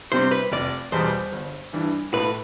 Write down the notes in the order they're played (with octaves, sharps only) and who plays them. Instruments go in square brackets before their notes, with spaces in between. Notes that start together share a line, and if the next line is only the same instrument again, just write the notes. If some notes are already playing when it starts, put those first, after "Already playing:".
[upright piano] C3 G3 C4 [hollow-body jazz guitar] C5
[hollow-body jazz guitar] B4
[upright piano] F1 [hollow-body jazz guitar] D5
[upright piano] E2 B2 G3 [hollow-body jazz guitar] C5
[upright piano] G1
G2 E3 G3 D4
[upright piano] A2 [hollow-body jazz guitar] B4